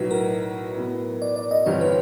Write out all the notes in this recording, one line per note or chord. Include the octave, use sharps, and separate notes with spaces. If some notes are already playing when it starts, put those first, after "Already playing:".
Already playing: B1 A2 F#3 B4
A#4
A2 F#3 B3
D5
D5
D#5
G1 G2 E3 G3 C4 C#5
B4